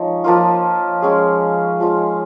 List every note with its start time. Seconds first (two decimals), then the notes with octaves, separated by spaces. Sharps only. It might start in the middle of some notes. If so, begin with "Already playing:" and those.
Already playing: F3 G#3 D#4 C#5
0.24 F3 A#3 F4
1.02 G#3 C#4 G#4
1.80 F3 G#3 F4